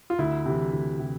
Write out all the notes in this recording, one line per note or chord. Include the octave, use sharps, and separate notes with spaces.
F4
D2 E4
C3 E3
D2
C3 E3